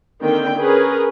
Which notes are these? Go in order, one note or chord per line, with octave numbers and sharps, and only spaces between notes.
D3 D#3 A#3 C4 G5
C#4 G#4 A#4 B4